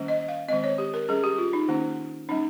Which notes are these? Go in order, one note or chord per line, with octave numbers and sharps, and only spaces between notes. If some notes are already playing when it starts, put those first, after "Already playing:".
Already playing: D#3 G3 A#3 C#4
D#5
F5
D#3 G#3 C4 D#5
C#5
G4
A#4
G3 C#4 G#4
G4
F4
D#4
D#3 A#3 C#4
G3 A#3 C#4 D#4